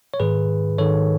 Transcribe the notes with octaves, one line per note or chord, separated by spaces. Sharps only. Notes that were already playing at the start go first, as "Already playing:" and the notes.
C#5
G#2 D#3 G#4 B4
G#2 D#3 A4 C#5